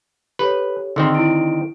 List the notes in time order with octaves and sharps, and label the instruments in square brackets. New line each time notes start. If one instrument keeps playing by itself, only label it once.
[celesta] G4 A4 C#5 [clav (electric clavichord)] B4
[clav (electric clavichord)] D3 D#3 C4 [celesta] G#4 C6 E6
[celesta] E4 D7